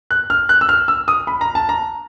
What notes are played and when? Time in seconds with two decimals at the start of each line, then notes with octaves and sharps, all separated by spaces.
0.11 F#6
0.30 F6
0.49 F#6
0.61 E6
0.69 F6
0.88 E6
1.08 D#6
1.27 B5
1.41 A#5
1.55 A5
1.69 A#5